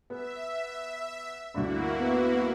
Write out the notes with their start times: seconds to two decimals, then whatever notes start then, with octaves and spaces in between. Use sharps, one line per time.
0.10 B3 E5
1.54 D2 G2 A#3 E4 F#4
1.99 B3